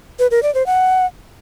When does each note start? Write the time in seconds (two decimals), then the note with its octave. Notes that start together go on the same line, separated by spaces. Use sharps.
0.19 B4
0.31 A#4
0.43 D5
0.54 C5
0.66 F#5